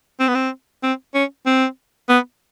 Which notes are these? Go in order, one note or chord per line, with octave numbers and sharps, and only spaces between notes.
C4
B3
C4
C4
C#4
C4
B3